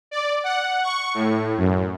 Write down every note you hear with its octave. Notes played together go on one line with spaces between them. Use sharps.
D5
F#5
C#6
A2
F#2